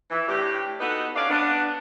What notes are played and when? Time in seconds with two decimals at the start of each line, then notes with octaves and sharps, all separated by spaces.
0.11 E3
0.28 A2 D4 G4
0.81 B3 D#4 F#4 A4 B4
1.16 C#4 D4 D5 F5
1.30 B3 D4